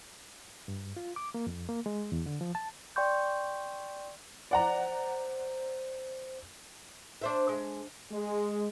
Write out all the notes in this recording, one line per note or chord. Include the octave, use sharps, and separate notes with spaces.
G2
F4
D6
A#3
F2
A#3
G#3
E2
D3
F3
A5
D5 G5 C6 C#6 G6
C5 D5 F#5 A#5
D4 C5 E5
G#3
G#3